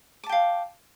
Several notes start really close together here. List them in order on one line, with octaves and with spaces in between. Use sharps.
D6 A5 G5 F5